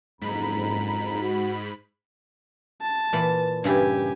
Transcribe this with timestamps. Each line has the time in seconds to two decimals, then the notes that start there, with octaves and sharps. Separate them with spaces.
0.21 F#1 F2 G#2 A#5 B5
1.21 F#4
2.82 A5
3.13 A#2 E3 B5
3.64 G2 C#3 E4 G4 G#5